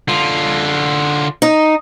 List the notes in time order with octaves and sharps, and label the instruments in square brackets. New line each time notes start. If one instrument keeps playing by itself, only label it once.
[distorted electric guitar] D3 F4
[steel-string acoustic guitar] D#4